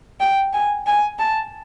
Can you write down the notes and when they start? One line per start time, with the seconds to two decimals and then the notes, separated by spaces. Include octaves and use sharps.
0.20 G5
0.53 G#5
0.87 G#5
1.19 A5